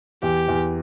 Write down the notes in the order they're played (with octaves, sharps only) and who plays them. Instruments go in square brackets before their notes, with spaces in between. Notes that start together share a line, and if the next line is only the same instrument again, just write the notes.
[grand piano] E2 [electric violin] G4
[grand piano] E2